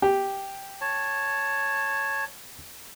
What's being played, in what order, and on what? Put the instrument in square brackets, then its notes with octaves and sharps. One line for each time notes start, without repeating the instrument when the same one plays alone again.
[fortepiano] G4
[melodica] C#5 A5